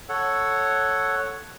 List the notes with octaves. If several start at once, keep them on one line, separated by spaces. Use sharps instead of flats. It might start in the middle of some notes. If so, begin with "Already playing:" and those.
A4 C#5 F#5